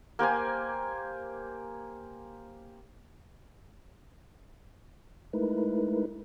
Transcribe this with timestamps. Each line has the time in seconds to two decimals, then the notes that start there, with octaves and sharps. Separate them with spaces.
0.19 A#3 G4 C5 G#5
5.33 G#3 A3 D#4 E4 A#4 B4